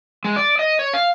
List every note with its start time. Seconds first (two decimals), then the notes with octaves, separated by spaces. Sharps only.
0.24 G#3
0.36 D5
0.59 D#5
0.79 C#5
0.94 F5